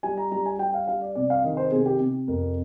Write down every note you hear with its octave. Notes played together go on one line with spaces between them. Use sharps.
G3 G#5
A#5
G3 A#5
G#5
G3 G5
F5
G3 F5
D5
C3 D5
F5
D#3 D#5
C5
C3 G#4
G4
C3
F2 A#4